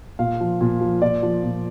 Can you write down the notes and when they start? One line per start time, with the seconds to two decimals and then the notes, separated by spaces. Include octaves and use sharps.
0.19 A#2 F5
0.40 F3
0.61 A#2
0.81 F3
1.02 A#2 D5
1.22 F3
1.44 A#2